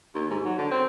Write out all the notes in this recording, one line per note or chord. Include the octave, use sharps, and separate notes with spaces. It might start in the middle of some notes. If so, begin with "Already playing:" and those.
D#2
G#2
F#3
D3
C4